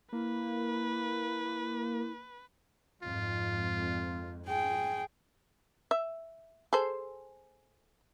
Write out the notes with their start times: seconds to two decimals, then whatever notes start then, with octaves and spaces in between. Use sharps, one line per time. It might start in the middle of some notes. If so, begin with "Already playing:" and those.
0.13 A#3 E4 B4
3.03 F2 G#2 F4
4.47 G#4 G5
5.91 E5
6.73 G#4 A4 C5